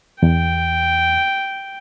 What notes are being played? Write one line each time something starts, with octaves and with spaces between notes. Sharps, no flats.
E2 G5